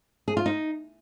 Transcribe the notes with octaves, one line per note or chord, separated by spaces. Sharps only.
G#4
F4
D#4